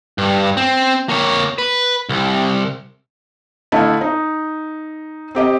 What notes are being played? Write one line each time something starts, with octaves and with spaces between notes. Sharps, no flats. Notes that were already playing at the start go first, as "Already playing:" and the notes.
G2
C4
A#3 C#5
B4
C2
D3 A3 E4 D#5 F5 A5
D#4
C4 G4 D#5